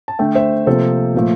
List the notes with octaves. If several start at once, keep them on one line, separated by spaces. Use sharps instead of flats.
A5
D3 A3 E5 G5
C5 E5
C3 F3 A#3 A4 C5
A#2 F3 A3